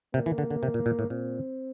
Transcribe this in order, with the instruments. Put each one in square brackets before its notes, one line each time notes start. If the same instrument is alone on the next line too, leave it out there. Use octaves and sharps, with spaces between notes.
[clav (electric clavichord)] C3 [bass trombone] A#3
[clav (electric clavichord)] E3
D3
D3
C3
A#2
A#2
A2
[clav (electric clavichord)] A#2 [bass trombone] C4